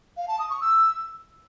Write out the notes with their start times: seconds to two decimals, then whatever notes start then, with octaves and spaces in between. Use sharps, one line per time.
0.17 F5
0.28 A5
0.39 D#6
0.50 C#6
0.61 E6